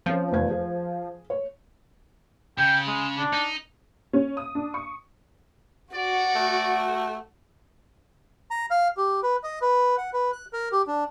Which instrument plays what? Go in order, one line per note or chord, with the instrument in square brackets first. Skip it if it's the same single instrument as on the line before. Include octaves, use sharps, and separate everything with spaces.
[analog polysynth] F3 [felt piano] C4 C#4
[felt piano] F1 E2 G#6
G#4
C#5
[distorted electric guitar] C#3 [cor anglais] G5
[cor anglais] G#3
D4
[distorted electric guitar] D#4
[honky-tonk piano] C#4
D#6
D4
C#6
[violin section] F#4 [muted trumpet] D5
[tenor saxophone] A3
[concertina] A#5
F5
G4
B4
D#5
B4
F#5
B4
F#6
A#4
G4
D4